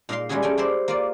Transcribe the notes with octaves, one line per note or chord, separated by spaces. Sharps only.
A#2 D#4 A#4 F5 C6
G3 G#3 C#4 E4 F#4 G#4
A3 C#4 G5 G#5
E4 G4 A#4 C5 D5
A#3 F4 D5